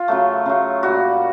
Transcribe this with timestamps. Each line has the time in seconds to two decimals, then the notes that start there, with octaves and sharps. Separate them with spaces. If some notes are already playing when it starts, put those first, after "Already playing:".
Already playing: F4
0.08 C#3 F#3 A3
0.46 C#3 F#3 A3
0.83 A#2 G3 F#4